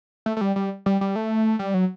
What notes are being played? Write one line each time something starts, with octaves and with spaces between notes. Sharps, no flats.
A3
A3
G3
G3
G3
G3
A3
G3
F#3